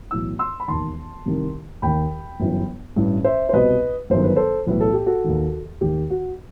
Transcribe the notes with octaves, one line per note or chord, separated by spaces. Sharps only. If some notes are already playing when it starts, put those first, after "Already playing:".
B1 A2 E3 E6
C6 E6
B5
E1 D#2 D#3 A5 C6
C2 C3 D#3
D#2 D#3 G5 B5
G1 F#2 E3
A1 G2 E3
C5 E5
C5
C2 B2 B4 D#5
G1 F#2 D#3 C5
B4
A4 C5
B1 A2 E3 B4
A4
G4
F#4 A4
D#2 D#3
D#2 D#3 G4
F#4